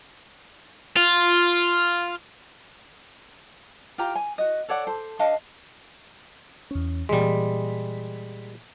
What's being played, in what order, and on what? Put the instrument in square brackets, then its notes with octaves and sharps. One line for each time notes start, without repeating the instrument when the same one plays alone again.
[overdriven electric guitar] F4
[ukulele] F4 G4 G5 A#5
G#5
F#4 D#5
A4 C#5 D5 F#5
A4 C5
D4 D#5 F5 A5
[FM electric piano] E2 C#4
[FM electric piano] A#2 E3 B6 [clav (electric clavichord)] G3 G#3